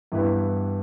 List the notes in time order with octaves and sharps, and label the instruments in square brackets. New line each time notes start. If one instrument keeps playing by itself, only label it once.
[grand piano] G2 E3 B3 E4 B4